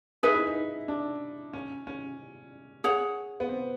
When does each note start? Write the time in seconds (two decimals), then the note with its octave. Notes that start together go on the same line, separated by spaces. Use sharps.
0.23 D#4 G#4 B4 E5
0.34 E4
0.47 D#4
0.88 D4
1.53 C#4
1.87 C#4
2.84 G#4 C#5 F#5
3.40 B3
3.48 C4